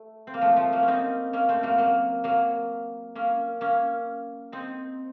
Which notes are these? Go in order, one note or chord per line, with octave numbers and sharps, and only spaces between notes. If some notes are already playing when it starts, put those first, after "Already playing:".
Already playing: A3
C4
A#3
F3 A3
F3 A3
F#3 A#3
C#4
C4 D#4
A#3 C#4
A3 C4
F#3 A#3
F#3 A#3
F#3 A#3
A#3 C#4
A#3 C#4
C4 D#4